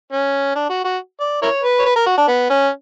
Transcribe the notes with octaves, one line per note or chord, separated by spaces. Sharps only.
C#4
D4
F#4
F#4
D5
E4 A#4 C#5
B4
C#5
B4
A#4
F#4
D4
B3
C#4